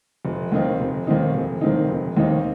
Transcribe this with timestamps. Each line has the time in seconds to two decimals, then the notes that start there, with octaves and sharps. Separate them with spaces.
0.25 F1
0.52 D#2 D#3 C4 D#4
0.80 F1
1.07 D#2 D#3 C4 D#4
1.34 F1
1.61 D#2 D#3 C4 D#4
1.89 F1
2.17 D#2 D#3 C4 D#4